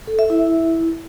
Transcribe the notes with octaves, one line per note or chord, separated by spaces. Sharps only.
A4
E5
E4